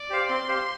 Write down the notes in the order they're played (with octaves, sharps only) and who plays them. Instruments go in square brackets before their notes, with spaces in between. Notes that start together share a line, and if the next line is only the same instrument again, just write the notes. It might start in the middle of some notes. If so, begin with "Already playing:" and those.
Already playing: [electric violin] D5
[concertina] G4 C5 F5
[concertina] C4 [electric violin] C6
[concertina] G4 C5 F5